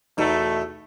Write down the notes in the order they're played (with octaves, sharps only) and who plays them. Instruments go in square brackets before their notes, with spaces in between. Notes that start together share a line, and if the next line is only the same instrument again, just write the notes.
[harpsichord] E2 B2 [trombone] A3 [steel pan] D#4